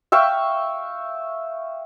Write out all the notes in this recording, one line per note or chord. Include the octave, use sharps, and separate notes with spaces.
E5 F5 G5 C#6